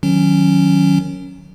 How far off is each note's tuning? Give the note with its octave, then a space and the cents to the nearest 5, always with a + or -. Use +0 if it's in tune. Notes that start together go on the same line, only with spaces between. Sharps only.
D#3 +0 F#3 -10 C#4 +0